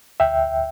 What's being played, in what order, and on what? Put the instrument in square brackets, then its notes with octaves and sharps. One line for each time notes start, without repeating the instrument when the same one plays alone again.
[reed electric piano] D2 E5 G5